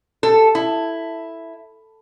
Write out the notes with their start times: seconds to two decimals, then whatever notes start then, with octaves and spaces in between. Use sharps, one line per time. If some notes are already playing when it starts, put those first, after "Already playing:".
0.23 A4
0.55 E4